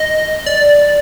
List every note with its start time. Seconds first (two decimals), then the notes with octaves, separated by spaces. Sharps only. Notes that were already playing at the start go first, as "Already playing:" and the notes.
Already playing: D#5
0.46 D5